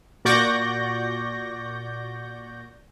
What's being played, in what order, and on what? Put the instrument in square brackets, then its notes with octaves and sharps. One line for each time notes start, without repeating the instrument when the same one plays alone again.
[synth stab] A#2 F#4 D5 C#6 G6 A#6